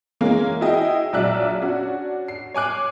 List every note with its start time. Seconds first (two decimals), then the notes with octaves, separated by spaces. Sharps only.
0.21 E3 G#3 A#3 C#4
0.61 E4 F#4 G#4 D#5 G5
1.13 A#1 F#3 D5 E5 F#6
1.61 C#4 D4 F#4
2.28 C7
2.54 C#5 G#5 D6 F#6